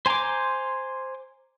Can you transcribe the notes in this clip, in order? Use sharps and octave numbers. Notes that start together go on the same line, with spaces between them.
C5 G#5 A#5 C6 D6